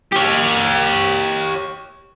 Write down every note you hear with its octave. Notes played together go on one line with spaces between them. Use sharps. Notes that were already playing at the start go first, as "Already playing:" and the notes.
G4 C#5